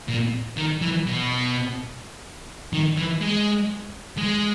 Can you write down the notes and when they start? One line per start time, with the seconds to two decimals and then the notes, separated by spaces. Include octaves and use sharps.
0.08 A#2
0.57 D#3
0.82 E3
1.06 B2
2.73 D#3
2.98 E3
3.21 G#3
4.18 G#3